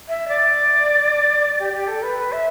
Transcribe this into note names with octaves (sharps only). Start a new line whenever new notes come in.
E5
D5
G4
G4
A4
B4
E5